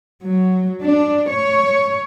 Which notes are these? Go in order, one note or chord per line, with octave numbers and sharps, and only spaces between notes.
F#3
D4
C#5